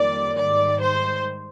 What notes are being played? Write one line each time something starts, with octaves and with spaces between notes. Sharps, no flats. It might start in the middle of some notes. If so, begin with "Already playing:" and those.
Already playing: F2 D#3 G3 A#3 D5
G#2 D#3 G3 D5
C5